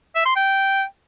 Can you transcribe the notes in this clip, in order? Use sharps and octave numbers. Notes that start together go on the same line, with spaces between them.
E5
C6
G5